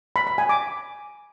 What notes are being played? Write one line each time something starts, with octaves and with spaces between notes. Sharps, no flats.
B5
B5
G#5
D6